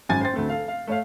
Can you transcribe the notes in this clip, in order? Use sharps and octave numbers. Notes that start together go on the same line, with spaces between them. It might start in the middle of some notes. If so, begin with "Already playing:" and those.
G#1 F#2 G#5 A6
C5 G5 C6 A6
D2 A3 C4
A4 F5
F5
A3 C#5 F5